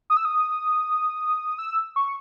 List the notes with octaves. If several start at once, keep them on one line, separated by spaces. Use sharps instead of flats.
D#6
E6
D#6
E6
C#6